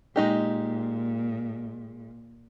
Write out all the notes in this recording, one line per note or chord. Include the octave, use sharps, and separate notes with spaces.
A#2 G#3 D#4 G4